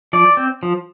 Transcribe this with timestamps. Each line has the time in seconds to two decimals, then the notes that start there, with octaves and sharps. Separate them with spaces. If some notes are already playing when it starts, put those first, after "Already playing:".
0.13 F3 D5
0.37 C4
0.63 F3